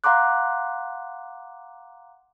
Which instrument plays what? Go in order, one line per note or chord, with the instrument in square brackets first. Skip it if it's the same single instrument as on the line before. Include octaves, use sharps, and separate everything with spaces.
[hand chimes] F5 F#5 A#5 C6 D6 F#6